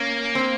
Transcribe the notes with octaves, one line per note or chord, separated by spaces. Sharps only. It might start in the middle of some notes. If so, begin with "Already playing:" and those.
Already playing: A#3 C#4
C4